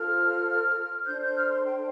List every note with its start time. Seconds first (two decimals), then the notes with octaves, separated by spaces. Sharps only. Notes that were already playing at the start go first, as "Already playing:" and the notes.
Already playing: F4 A4 C5 F6
1.06 D4 A4 C5 G6
1.21 G6
1.36 F6
1.50 C6
1.65 G5